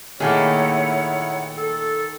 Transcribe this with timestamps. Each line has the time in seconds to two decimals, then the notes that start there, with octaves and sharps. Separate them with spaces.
0.20 A#2 D#3 A3 A#3 E4 G#4 C#5 F#5
1.58 A4